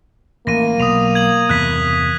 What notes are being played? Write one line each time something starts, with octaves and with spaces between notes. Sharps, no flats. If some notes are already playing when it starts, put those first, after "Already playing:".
A1 A#3 A#6 D#7
B1 D#6 D#7 F7
G#6 D#7 F#7
E2 G2 C3 F#6 B6